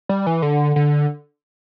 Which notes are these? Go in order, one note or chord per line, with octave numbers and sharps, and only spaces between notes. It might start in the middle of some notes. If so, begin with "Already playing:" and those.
G3
E3
D3
D3